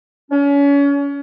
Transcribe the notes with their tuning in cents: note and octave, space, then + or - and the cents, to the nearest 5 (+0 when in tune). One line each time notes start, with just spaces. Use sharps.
C#4 +35